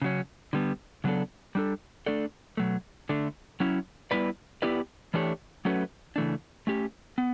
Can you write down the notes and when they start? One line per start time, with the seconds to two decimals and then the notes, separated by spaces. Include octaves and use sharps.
0.02 C#3 F#3 C#4
0.53 D3 G3 B3
1.04 C#3 F#3 B3 D4 A4
1.55 G3 D4 A4
2.06 A3 D4 A4 D5
2.57 B2 F#3 A3
3.09 D3 A3 D4
3.60 F#3 C#4 E4
4.11 G3 B3 E4 B4 D5
4.62 B3 E4 G4 B4 D5
5.14 E3 A3 D4 G4 C#5
5.65 F#3 A3 C#4 F#4 B4
6.16 C#3 E3 A3 D4
6.67 A3 C#4 G4
7.18 B3